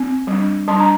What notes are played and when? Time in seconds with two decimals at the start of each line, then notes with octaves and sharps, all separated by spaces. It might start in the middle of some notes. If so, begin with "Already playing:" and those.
Already playing: C4
0.27 G3 D4
0.68 G3 D4 A5 C6
0.80 A#5